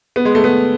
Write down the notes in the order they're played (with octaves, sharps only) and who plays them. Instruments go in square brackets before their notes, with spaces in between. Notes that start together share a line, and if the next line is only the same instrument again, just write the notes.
[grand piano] B3
G#3
A3
B3